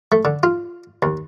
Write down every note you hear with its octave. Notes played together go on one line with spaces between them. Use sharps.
A3
D3
F4
D#2